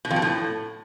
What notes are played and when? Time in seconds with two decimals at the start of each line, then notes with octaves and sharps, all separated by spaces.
0.05 B2
0.11 F2
0.16 B2
0.22 A2